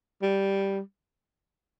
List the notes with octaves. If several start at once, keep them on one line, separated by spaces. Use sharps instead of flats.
G3